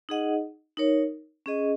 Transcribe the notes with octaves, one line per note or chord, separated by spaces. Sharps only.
D#4 G#4 D#5 F#5
D#4 A#4 C#5
C#4 G#4 D#5